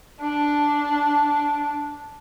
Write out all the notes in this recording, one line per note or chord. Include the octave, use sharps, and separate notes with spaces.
D4 A5